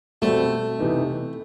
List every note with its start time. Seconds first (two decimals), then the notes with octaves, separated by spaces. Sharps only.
0.22 B2 G3 A3 C4
0.79 C3 E3 B3 D#4